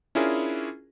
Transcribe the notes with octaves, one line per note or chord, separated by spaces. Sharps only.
C#4 D4 E4 F4 G#4 A#4